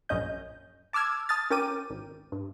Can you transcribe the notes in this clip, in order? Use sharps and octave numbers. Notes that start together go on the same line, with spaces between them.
A#1 F#2 C#4 D#5 G6
A5 D6 E6 F6 G#6
A5 D#6 F6 A6
C#4 A#4 G5 D6 D#7
G#1
G2